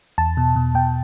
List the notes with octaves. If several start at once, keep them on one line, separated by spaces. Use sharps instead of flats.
E2 A5
B2
B2
B2 G5